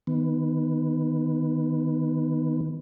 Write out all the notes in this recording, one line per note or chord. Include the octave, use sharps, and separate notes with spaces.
D#3 B3